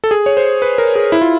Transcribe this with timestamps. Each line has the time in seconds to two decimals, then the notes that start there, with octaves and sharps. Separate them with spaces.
0.04 A4
0.11 G#4
0.26 C#5
0.37 C5
0.62 B4
0.78 A#4
0.95 G#4
1.12 E4
1.22 F4